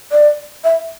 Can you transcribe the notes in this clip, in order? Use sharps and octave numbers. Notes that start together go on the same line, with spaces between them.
D5
E5